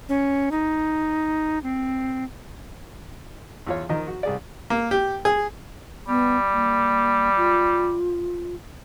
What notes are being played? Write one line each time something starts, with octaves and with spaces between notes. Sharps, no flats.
C#4
D#4
C4
E2 F4 C#5
D#3 F3 D#5 A#5
F#4
C2 G#4 D5
A#3
G4
G#4
G3 B3
A#3
F4